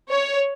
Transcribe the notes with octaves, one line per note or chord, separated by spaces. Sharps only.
C#5